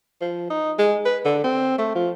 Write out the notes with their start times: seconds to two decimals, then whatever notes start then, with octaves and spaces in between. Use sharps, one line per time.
0.21 F3
0.50 D#4
0.78 G#3
1.05 B4
1.25 D3
1.44 C4
1.78 A3
1.95 F3